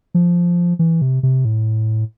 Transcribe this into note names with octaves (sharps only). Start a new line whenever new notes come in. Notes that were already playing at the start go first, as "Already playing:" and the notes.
F3
E3
C3
C3
A2